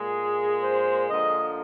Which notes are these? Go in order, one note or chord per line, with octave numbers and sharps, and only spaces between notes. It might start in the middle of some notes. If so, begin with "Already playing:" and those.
Already playing: A#2 G#3 G#4
C5
D3 F3 A#3 D#5